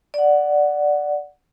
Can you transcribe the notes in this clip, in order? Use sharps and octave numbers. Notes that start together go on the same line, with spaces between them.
D5 F#5